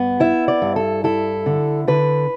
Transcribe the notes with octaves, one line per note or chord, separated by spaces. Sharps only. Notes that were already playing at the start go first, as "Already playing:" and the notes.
Already playing: G2 B3
E4 E5
D5
G2
A4
E4 A4
D3
D3 B4